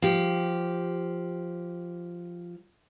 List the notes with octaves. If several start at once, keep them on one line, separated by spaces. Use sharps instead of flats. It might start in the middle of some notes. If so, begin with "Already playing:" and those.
F3 G4